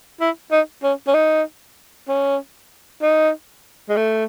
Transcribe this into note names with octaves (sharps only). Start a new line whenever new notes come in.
E4
D#4
C#4
C#4
D#4
C#4
D#4
G#3
A3